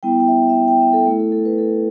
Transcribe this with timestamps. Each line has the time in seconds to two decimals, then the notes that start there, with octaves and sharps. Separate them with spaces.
0.03 G3 B3 E4 G5
0.20 G5
0.28 E5
0.49 E5
0.55 G5
0.68 G5
0.81 E5
0.93 A4
1.06 A3 E4 A4
1.19 A4
1.32 A4
1.45 B4
1.58 A4